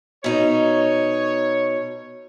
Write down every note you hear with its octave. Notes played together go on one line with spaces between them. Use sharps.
B2 D#4 C#5